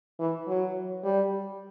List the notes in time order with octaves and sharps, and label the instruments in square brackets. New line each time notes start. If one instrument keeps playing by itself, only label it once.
[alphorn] E3
F#3
G3